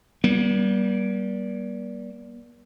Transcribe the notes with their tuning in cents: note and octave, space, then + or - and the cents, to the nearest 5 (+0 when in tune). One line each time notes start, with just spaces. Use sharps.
G3 -15 A#3 +45